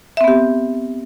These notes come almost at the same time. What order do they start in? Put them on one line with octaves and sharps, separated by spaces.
E5 C4 B3 G4